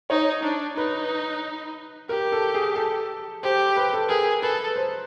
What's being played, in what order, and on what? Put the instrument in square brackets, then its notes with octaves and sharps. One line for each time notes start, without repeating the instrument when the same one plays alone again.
[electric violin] D#4 [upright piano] C#5
[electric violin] D4
[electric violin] D#4 [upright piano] B4
[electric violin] G4 [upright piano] A#4
[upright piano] A4
G#4
A4
[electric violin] G4 [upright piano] C5
[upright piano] B4
A4
[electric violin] G#4 [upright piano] A#4
[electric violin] A4 [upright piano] B4
[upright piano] C5